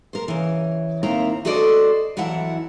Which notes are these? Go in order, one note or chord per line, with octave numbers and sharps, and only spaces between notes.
A#4 C5
C#3 E3
D#2 A#3 C4 E4 A#5
D2 F#4 A4 C5 D5 D#5
F2 E3 F#3 E4 F#5 A5